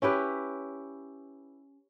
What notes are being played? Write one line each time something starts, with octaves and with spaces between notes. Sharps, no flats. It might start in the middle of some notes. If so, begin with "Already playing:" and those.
C#4 E4 G4 B4